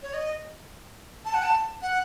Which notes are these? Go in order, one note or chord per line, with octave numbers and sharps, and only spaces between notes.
C#5
D#5
A5
F#5
A5
F#5